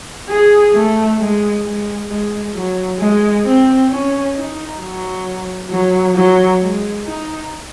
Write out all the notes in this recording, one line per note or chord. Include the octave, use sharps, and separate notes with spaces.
G#4
A3
G#3
G#3
G#3
F#3
G#3
C4
C#4
D#4
F#3
F#3
F#3
G#3
D#4